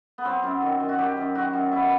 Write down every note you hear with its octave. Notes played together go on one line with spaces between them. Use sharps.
B3
F#3 C4
F#2
D#3
F#2
F#4
F#3 G4
F#2
D#3 F#4
F#2
B2 E4